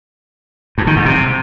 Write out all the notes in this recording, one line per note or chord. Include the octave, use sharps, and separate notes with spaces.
G2
D#3
G#2
C3